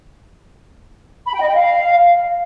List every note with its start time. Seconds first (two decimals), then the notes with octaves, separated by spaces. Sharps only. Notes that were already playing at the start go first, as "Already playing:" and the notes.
1.27 B5
1.34 G5
1.41 D#5
1.48 G5
1.55 F5